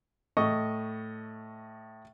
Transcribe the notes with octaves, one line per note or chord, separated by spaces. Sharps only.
A2 D#5 C#6